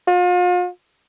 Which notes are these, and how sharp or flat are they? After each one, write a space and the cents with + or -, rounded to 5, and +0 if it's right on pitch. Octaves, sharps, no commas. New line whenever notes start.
F4 +40